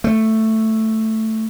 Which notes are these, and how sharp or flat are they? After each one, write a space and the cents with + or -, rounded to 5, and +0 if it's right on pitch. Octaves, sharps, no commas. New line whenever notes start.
A3 +5